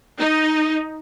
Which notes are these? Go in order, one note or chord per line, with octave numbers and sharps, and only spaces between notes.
D#4